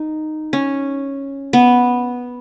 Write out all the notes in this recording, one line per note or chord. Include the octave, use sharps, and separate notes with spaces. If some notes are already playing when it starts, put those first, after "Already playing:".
Already playing: D#4
C#4
B3